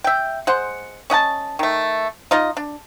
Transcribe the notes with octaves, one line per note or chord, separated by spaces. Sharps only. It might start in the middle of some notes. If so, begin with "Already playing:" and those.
E5 G5
G#3 C5 F#5
C#4 D#5 F#5 A5
D#3 A3
D#4 F4 D#5
D4